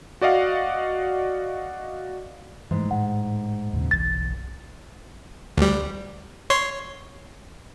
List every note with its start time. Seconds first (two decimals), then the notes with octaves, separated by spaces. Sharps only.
0.21 F#4 D5 D#5 F5 F#5
2.71 G#2 E3 A3
2.91 A2 G#3 F#5
3.73 D#2 A#2 C#3
3.91 F#1 B1 E3 A6
5.57 D2 G3
6.50 C#5 C6